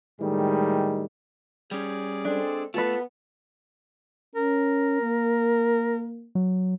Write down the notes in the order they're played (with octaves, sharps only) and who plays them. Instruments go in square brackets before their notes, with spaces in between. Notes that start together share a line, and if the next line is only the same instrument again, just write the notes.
[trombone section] A2 D#3 G3 G#3
[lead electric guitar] G3 C#4 [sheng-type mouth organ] G#4 D5
[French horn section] G#3 C4 A4 [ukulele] D4
[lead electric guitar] A3 [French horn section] B3 [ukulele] F4 A4 B4
[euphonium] C#4 [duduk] A#4
[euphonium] A#3
[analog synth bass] F#3